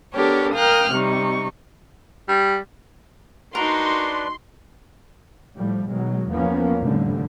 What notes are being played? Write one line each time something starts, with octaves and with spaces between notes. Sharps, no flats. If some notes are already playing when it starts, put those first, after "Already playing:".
B3 D4 G4 A4 A#4 C#5
A#4 F5 G5 D#6 F6 F#6
C3 G3 D#4 C#6
G3
D4 D#4 F#4 A#4 B4 D5 C6
A2 F3 G3
B2 D#3 F#3 G#3
E2 F3 A#3 B3 C#4
F1 A2 D3 G3